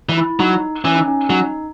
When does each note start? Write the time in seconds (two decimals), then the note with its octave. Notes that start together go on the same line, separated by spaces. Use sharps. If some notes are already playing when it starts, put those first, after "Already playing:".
0.09 E3
0.17 E4
0.39 F#3 D#4
0.84 E3 C#4
0.96 D#4
1.08 C#4
1.29 F#3 D#4